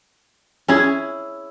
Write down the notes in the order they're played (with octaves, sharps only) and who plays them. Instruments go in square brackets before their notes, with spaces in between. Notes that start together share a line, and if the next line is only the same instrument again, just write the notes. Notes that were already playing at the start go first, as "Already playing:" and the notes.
[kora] C#4 E4 G#4